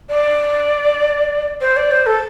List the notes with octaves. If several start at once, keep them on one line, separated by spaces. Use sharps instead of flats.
D5
C5
D5
C5
A4